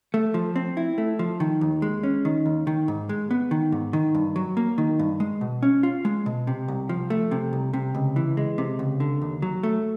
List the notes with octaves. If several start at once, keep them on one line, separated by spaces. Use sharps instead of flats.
A3
F3
C4
E4
A3
F3
D#3
D#2
G#3
C#4
D#3
D#2
D#3
G#2
G#3
B3
D#3
G#2
D#3
G2
F#3
A#3
D#3
G2
G#3
B2
C#4
F4
G#3
B2
C3
C2
F3
A3
C3
C2
C3
C#2
E3
G#3
C3
C#2
D3
D#2
F#3
A3